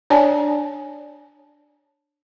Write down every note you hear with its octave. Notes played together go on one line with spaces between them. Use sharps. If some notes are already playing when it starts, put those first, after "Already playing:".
D4 C#5 D5 G#5 A5